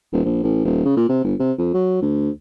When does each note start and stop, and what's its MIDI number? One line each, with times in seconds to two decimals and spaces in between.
0.13 0.24 27
0.25 0.39 34
0.43 0.60 33
0.65 0.83 27
0.85 0.93 49
0.97 1.08 46
1.09 1.22 48
1.24 1.34 31
1.40 1.52 48
1.59 1.73 41
1.74 1.97 54
2.02 2.30 38